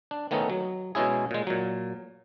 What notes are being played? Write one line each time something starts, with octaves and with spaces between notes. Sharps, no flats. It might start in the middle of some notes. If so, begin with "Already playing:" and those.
D4
D#3 A3 B3 C#4 D#4
F#3
B2 G#3 C#4 E4 G#4
A#2 G#3
A#2 F#3